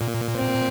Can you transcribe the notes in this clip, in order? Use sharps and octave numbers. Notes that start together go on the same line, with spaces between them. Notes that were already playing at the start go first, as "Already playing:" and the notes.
Already playing: A#2
C4